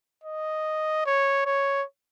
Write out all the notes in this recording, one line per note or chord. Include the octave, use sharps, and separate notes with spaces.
D#5
C#5
C#5